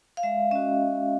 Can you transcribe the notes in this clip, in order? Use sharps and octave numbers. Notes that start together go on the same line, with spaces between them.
F5
G#3 E5
C#4 F#4 D#5